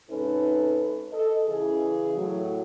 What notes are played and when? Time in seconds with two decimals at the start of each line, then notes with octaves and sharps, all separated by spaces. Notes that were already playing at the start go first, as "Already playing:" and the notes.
0.10 G#2 C3 C#4 D#4 A4 B4
1.12 A4 D#5
1.47 C#3 E3 G#4
2.17 A2 F#3